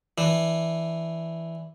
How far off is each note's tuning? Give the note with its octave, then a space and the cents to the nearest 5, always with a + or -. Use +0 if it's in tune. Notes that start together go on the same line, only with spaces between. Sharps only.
E3 +0 D4 +0